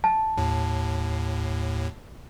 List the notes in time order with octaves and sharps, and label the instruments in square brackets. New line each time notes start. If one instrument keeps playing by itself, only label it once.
[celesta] A5
[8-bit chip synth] D#2 A2